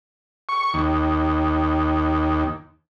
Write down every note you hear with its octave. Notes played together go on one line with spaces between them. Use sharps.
C#6
D#2